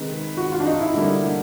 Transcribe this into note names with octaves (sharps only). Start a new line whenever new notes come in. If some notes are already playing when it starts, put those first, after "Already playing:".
Already playing: C3 D#3 G#3 B4
F#4
F4
D4
D#4
E4
D3 G3 A#3